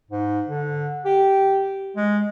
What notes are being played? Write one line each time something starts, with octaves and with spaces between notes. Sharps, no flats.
G#2
D3
G4
G#3